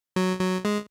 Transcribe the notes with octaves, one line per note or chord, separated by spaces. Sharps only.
F#3
F#3
G#3